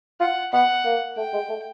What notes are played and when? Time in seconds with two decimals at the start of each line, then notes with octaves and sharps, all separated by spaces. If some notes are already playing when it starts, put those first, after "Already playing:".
0.20 F4 F#5
0.53 B3 F#5
0.85 A#3
1.17 A3 G5
1.33 G#3
1.49 A3